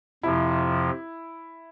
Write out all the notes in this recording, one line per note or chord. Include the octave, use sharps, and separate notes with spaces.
F2 C3 F3 E4